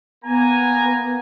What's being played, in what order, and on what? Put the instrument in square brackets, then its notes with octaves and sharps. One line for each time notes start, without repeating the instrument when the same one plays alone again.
[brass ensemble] A#3 G#5 A#5 [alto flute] B3